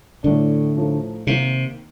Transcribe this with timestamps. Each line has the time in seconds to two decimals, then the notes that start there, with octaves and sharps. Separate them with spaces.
0.23 A2 D3 A3 D4
0.75 A2 F3 A3 D#4
1.27 C3 D#3 A#3 D#4